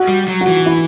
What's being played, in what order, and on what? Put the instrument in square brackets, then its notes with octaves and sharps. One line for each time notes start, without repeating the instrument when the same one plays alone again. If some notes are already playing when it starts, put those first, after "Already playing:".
Already playing: [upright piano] F#4
[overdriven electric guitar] G3
F#3
[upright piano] F#4
[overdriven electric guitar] E3
[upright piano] E4